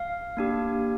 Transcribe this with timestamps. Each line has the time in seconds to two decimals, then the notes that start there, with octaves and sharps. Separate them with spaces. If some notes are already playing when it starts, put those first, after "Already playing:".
Already playing: F5
0.37 A#3 D4 G4